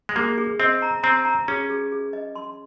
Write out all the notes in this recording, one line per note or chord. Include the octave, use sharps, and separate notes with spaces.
G#3
A#3 G#4
G#4
C4 D#5
A#5
C4 A#5
A#5
C#4 G#4
G#4
G#4
D#5
C6